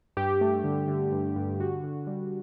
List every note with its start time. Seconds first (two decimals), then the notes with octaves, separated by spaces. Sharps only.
0.17 G2 G4
0.41 A3
0.64 D3
0.88 D3
1.12 G2
1.36 G2
1.60 D3 F#4
1.83 D3
2.07 G3